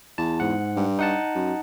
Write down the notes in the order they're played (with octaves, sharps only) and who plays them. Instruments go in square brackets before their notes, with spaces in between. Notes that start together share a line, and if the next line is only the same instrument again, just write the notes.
[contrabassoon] E2 [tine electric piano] A5
[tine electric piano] G#2 F#5
[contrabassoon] G2
[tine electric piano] D#4 F#5 A5
[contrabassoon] F#2